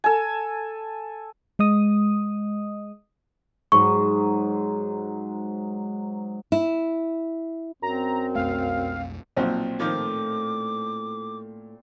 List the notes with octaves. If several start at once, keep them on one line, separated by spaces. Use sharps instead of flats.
A4 G#5
G#3 D#5 D#6
G#2 F#3 C#6
E4
F#2 C4 A#5
B1 F2 A3 F5
B1 A#2 F3 C4 F#4
A2 D#3 F3 A3 C#5 D6